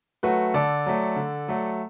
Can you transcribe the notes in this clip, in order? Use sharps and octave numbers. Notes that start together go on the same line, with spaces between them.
F#3 A3 F#4 B4
D3 A4 D5
F#3 A3
D3
F#3 A3